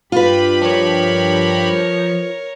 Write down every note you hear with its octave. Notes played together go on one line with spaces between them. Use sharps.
G2 F4 G4 B4 B5
F3 A#4 C#5